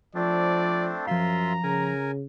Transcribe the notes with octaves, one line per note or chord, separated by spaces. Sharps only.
F3 A3 C4 D4 D5
F#2 F3 F4 E5 F5 A#5 C6
C#3 A#4 G#5